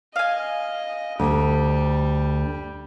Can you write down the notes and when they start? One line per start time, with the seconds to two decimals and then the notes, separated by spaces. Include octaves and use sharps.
0.16 D#5 F5 G#5
1.20 D2 G3